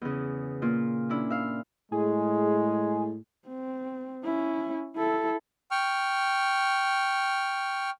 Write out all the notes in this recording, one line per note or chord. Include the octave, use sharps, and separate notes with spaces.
E2 C#3
A#2 F4
C#4 D4 E4
E5 F5
A2 G#3 G#4
C4
C#4 E4
E4 A4
G5 C#6 F6